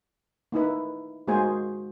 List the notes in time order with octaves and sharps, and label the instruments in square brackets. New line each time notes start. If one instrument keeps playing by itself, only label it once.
[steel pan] A#3 D#4 E4 B4
G#3 A#3 F#4 G#4 C5 G#5